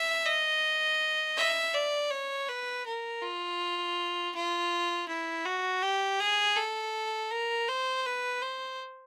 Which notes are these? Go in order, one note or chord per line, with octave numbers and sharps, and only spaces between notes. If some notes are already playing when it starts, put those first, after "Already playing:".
Already playing: E5
D#5
E5
D5
C#5
B4
A#4
F4
F4
E4
F#4
G4
G#4
A4
A#4
C5
B4
C5